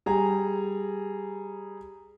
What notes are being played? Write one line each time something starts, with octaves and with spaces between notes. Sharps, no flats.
G3 G#4 A#5